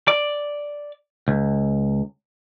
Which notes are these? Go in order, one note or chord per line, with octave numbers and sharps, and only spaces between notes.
D5
C#2